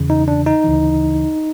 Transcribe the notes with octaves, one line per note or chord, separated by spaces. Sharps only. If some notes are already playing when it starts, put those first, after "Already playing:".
Already playing: E2 C#3 E3
D#4
D4
D#4
D2 C#3 E3